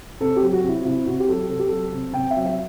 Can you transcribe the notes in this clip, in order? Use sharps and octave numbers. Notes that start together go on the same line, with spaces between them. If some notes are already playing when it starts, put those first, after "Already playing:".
C3 A4
G4
F#3
F#4
C3
E4
C3 E4
C3 F#4
G4
F#3 A4
C3 A4
G4
F#3 A4
C3
C3 G5
E5
F#3
E5